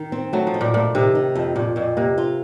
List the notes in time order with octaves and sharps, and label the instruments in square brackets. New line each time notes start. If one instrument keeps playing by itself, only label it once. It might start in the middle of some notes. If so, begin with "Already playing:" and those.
Already playing: [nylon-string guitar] D#3
C4
[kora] F#3 [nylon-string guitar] A3
[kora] F3
[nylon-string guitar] D#3
[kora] A#2
[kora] A#2 [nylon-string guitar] A3
[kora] C3 [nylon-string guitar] D#3
[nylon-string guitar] D#3
F2
[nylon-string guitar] F2 [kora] A#2
[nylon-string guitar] F2 [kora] A#2
[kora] C3 [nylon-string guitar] A#3
[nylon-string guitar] F4